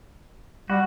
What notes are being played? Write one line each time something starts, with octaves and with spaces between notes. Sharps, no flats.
G3 F#4